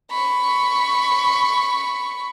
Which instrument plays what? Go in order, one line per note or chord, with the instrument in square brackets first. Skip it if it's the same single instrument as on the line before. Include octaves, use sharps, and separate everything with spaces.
[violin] B5 C#6